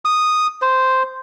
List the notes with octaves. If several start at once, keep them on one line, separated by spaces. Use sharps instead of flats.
D#6
C5